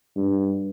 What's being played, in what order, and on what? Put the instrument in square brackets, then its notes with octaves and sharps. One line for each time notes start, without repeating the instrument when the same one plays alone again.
[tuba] G2